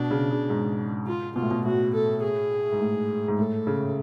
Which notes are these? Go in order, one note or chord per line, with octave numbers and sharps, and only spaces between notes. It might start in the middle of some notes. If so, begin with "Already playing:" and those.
Already playing: B2 D4
C#3
C#3
G#2
F4
B2 F4
A2
B2
A2 F#4
A4
G#4
G#2
A2
G#2
A2 A4
C#3